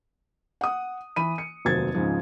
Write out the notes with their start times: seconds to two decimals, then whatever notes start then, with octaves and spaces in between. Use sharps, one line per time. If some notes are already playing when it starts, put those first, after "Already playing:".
0.61 F#5 D#6
1.16 E3 B5 D#7
1.38 C#7
1.65 F1 D#2 F#3 C5 G#6 A6
1.95 C#2 G#2 F3